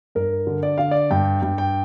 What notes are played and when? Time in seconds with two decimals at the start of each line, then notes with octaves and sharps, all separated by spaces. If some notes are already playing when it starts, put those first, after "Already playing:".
0.15 G2 A#4
0.47 D3
0.63 D5
0.78 D3 F5
0.91 D5
1.11 G2 G5
1.42 G2
1.58 G5